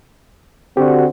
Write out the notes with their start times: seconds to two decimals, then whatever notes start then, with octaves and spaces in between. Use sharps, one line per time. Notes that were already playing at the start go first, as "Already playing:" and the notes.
0.77 D3 C4 D4 F#4 G4